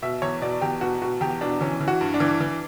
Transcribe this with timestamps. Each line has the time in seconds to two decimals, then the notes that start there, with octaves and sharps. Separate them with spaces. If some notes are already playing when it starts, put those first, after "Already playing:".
0.02 B2 E5
0.22 E2 C#5
0.41 B2 D5
0.61 E2 G4
0.81 B2 F#4
1.02 B2 F#4
1.21 E2 G4
1.41 B2 D4
1.61 E3 C#4
1.81 E3
1.88 F#4
2.01 G2
2.14 D4
2.20 E3
2.41 E3